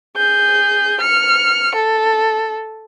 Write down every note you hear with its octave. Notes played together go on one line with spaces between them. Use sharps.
G#4 G6
F6 C#7
A4